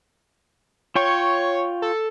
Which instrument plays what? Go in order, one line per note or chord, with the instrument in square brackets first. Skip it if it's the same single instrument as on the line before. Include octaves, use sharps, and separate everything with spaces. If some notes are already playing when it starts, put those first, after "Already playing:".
[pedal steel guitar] F4 G5 C#6 [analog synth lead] C#5
[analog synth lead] A4